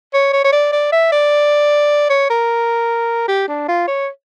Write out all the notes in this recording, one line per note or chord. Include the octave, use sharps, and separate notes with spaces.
C#5
C#5
C#5
D5
D5
E5
D5
C#5
A#4
G4
D4
F4
C#5